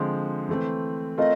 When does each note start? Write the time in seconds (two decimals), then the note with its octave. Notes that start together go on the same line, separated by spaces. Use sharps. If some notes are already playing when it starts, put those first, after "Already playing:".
Already playing: D3 F3 G#3 C4
0.49 E3 A3 C4
1.18 A3 C4 F4 A#4 D#5